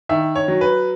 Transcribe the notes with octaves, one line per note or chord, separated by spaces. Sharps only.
D#3 E5
C#5
F#3
B4